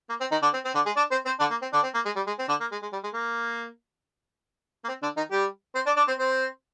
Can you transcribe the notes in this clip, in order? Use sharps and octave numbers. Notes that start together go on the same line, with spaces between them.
A#3
C4
D#3 D#4
D3 D4
C4
C4
D3 D4
G#3 G#4
D4 D5
C4 C5
C4 C5
D3 D4
A#3
C4
D3 D4
C4
A#3
G#3
G3
G#3
C4
D3 D4
A#3
G#3
G#3
G3
G#3
A#3
A#3
C4
D3 D4
D#3 D#4
G3 G4
C4 C5
D4 D5
D4 D5
C4 C5
C4 C5